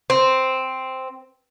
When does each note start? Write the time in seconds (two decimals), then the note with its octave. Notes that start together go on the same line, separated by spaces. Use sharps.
0.10 C4